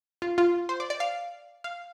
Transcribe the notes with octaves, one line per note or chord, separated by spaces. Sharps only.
F4
F4
C5
D5
D5
F5
F5